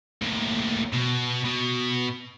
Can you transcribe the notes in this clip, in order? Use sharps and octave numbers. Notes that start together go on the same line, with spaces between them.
D#2 A2
B2
B2